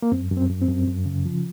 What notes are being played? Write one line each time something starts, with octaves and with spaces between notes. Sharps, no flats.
A#3
F#2 C4
F#2
C4
F#2
C4
F#2
F#2
C#3
F3